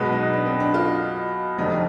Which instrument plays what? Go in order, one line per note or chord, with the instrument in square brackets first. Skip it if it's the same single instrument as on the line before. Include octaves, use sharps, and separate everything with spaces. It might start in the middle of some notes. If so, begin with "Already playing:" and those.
Already playing: [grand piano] B1 B2 G#3 [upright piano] B4
[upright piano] D#4
D4
C4
D4
F4
[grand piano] F1 F2 D3 G3 [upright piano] D#4